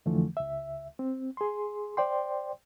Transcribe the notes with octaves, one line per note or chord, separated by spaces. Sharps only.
F2 D3 E3 F3 A3
C#2 E5
C4
G#4 C6
C5 D5 G5 C6